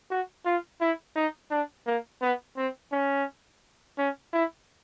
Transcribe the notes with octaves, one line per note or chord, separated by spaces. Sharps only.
F#4
F4
E4
D#4
D4
A#3
B3
C4
C#4
C#4
E4